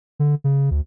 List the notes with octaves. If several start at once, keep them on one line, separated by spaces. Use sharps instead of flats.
D3
C#3
D2